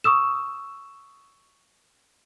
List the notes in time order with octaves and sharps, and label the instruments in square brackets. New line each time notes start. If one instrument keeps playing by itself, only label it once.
[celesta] C#6 D#6 E6 E7